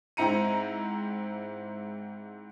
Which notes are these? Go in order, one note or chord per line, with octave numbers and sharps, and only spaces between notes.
G#2 C4 E4 A#5 C#7 D#7